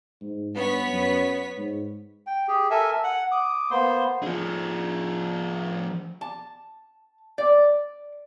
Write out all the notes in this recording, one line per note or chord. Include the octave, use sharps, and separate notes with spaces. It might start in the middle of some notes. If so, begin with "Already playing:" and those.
G#2
G2 B3 C#5 B6
F#2
G#2
G5
G4 G#4
A4 A#4 E5 G#5
F#5
D6 D#6
A#3 B3 C5 C6
F3 G#4
A5
D5